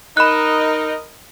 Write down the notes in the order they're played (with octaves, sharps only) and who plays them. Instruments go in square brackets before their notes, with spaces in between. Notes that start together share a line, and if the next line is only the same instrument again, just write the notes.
[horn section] D#4 [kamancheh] A#4 D#5 [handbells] B5 F#6